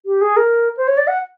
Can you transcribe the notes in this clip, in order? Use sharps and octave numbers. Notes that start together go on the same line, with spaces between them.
G4
G#4
A#4
C5
C#5
D5
F#5